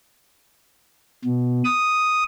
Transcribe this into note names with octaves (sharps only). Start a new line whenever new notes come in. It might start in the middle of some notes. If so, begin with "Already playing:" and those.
B2
D#6